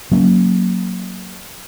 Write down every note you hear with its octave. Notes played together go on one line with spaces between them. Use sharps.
F#3 A#3 C#4